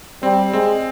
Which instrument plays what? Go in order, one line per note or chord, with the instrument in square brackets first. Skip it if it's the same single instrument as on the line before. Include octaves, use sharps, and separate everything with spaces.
[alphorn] G3 [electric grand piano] C4
[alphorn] G#3 [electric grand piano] C4